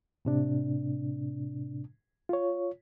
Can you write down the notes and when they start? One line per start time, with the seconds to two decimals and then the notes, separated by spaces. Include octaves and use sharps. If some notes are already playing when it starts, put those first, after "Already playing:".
0.25 A2 C3 D4
2.29 F4 C#5